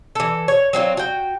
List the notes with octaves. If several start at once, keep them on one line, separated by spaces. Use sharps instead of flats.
E3 A4
C#5
F#3 C4 D#4 F4
F#4 G5